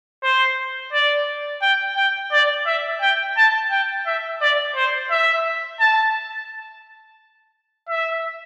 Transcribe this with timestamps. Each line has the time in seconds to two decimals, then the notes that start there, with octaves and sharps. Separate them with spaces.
0.23 C5
0.93 D5
1.62 G5
1.96 G5
2.32 D5
2.66 E5
3.01 G5
3.36 A5
3.71 G5
4.06 E5
4.41 D5
4.75 C5
5.11 E5
5.80 A5
7.89 E5